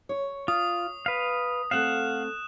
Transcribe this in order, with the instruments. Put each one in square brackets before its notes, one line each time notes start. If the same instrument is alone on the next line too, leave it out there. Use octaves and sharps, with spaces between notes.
[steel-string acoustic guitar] C#5
[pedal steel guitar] F4 [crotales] D#6
[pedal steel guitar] B4 F5
[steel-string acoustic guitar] A3 C4 [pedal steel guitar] F5 F#5 [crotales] F#6 E7